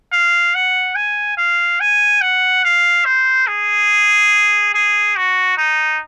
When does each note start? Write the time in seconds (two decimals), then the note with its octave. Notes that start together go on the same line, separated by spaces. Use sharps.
0.12 F5
0.55 F#5
0.95 G#5
1.37 F5
1.81 G#5
2.21 F#5
2.65 F5
3.05 C5
3.47 G#4
4.74 G#4
5.16 F#4
5.57 D#4